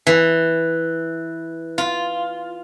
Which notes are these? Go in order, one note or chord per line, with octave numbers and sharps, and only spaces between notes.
E3
F4